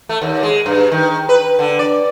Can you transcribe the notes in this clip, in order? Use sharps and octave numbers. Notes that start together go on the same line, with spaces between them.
A3
D#2
G#3
G2
D#3
B4
D3
D5